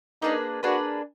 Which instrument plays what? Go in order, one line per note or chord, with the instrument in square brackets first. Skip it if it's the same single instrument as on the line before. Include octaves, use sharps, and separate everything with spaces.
[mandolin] A#3 D4 G#4 B4 [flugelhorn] D#4
[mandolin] A#3 D4 G#4 B4 [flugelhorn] F#4